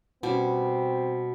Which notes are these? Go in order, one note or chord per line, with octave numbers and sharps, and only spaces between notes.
B2 G3 C4 C#4